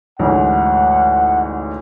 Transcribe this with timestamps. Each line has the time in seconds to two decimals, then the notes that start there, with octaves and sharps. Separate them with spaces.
0.19 A1 D2 G#2 F#5